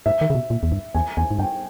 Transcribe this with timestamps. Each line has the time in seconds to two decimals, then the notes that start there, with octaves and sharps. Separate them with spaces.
0.06 G#2 E5
0.21 D#3
0.30 C#3
0.35 B2
0.50 A#2
0.63 E2
0.72 G2
0.94 E2 G#5
1.17 E2 G#5
1.31 G#2
1.39 G2 G5